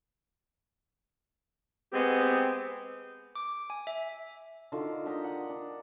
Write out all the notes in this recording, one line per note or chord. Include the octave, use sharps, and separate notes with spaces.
G#3 B3 C4 G4
D6
G#5
E5
D3 D#3 F4 F#4
D4 G4 A#4 D#5
F#5
D4